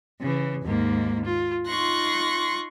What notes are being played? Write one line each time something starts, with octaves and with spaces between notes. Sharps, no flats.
C#3 E3
D#2 G#2 A#3
F4
D#4 F4 C6 C#6 F#6 A#6